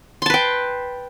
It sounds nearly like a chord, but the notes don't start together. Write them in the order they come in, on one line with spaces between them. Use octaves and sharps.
C6 A5 B4 G5